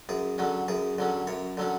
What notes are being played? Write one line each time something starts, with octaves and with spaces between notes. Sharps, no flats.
F#2 G#4
D3 F#3 C#4
F#2 G#4
D3 F#3 C#4
F#2 C#5
D3 F#3 C#4